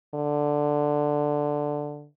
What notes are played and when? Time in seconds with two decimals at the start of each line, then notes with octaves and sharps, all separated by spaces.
0.14 D3